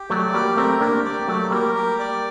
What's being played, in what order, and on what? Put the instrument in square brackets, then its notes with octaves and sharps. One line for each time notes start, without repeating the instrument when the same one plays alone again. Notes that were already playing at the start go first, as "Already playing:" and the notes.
Already playing: [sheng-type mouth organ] G4
[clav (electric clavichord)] F#3 A3 [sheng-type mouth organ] D5
[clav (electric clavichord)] G3 A#3 [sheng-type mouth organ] G4
[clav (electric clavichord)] A3 C4 [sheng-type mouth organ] A#4
[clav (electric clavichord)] A#3 D4 [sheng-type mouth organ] G4
[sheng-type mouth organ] D5
[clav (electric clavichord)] F#3 A3 [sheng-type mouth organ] G4
[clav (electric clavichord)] G3 A#3 [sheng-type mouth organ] A#4
[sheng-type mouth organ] G4
D5